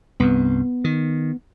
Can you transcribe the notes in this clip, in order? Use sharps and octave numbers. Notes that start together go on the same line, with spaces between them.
C2 G2 B3
D#3